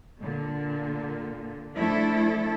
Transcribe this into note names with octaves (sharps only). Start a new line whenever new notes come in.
A#2 D3
F3 A3 D4 E4 A4